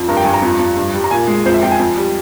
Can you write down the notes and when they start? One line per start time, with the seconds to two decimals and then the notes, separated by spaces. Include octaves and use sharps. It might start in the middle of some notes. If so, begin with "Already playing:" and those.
Already playing: F2
0.08 G2 A#4
0.17 G5
0.25 G2 G#5
0.34 A#5
0.42 F2
0.59 F2
0.77 G2
0.94 G3
1.04 A#5
1.10 A#2 G#5
1.28 G#3
1.45 F2 C5
1.54 E5
1.63 F2 G5
1.72 G#5
1.79 F2
1.96 G3